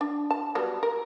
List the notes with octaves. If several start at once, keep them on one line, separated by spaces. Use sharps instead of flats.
D4
A5
F#3 G3 B3
A#4